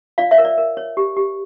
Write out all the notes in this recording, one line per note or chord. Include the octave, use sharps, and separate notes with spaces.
F4 D5 F5
C#5 E5
A#4
D5
A#4
C#5
G4
G4